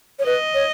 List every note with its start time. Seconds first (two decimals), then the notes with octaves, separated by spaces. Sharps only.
0.19 C#5
0.25 B4 D#5
0.54 C#5